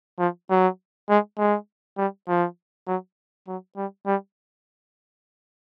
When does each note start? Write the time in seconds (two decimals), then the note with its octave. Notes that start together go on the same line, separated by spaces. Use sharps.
0.19 F3
0.50 F#3
1.09 G#3
1.38 G#3
1.98 G3
2.28 F3
2.87 F#3
3.48 F#3
3.77 G3
4.06 G3